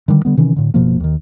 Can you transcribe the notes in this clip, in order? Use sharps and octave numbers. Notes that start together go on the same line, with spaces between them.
D3 D#3 G3
D3 G3 B3
C3 D#3 E3 C#4
A2 D3
F#1 B2 F3 A#3
D#2 D#3